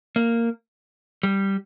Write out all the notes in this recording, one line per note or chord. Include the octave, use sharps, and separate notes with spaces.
A#3
G3